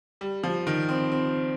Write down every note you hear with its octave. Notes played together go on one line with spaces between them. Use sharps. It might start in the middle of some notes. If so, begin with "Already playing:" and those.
G3
F3
D#3
C4
C4